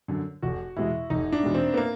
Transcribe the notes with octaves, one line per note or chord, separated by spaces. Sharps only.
F#2 D3
F1 F#4
E2 B2 G#3 E4
F1 D#4
D4
E2 B2 G#3
C4
B3
A#3